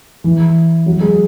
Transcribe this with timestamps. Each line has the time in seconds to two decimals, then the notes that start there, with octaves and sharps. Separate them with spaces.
0.24 E3
0.86 F#3
1.00 G#3